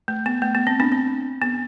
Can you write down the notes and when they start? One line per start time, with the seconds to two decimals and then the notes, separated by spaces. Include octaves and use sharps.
0.08 A3
0.26 B3
0.42 A3
0.55 B3
0.67 C4
0.80 B3 D4
0.92 C4
1.42 B3